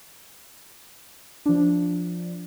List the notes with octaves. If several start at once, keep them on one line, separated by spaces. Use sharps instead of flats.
F3 D4